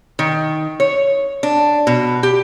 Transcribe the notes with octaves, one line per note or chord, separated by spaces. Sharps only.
D#3
C#5
D4
B2
G4